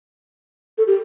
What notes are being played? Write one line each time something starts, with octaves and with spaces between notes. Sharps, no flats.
A4
G4